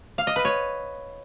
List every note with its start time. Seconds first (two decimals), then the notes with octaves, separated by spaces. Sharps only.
0.18 F5
0.27 D#5
0.36 B4
0.45 C#5